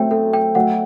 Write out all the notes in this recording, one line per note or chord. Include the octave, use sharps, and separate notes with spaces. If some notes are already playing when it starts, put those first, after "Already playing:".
Already playing: F#3 A3 C4 E5 G5
A4
G5
F#3 A3 F#5